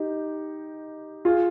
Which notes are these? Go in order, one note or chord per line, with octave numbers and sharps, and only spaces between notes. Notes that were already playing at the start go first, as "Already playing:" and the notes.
Already playing: D#4 G4
F4 G#4